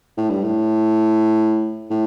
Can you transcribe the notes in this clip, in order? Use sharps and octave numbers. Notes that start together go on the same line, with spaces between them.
A2
G2
A2
A2